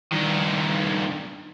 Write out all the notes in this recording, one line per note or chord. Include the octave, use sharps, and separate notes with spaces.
G2 D#3